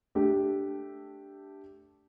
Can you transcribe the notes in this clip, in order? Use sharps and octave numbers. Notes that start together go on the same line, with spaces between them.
A3 D4 G4